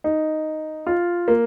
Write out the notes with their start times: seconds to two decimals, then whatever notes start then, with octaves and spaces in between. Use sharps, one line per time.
0.04 D#4
0.87 F4
1.28 A#3